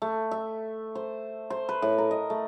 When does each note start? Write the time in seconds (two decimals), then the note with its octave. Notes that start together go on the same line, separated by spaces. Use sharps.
0.02 A3
0.31 E5
0.95 C5
1.50 C5
1.69 B4
1.82 A2
1.98 A#4
2.11 D#5
2.30 A3